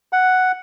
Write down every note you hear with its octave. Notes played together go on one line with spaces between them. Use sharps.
F#5